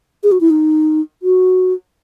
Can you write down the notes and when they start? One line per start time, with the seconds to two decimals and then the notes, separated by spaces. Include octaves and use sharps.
0.23 G#4
0.32 F#4
0.41 E4
0.50 D#4
1.23 F#4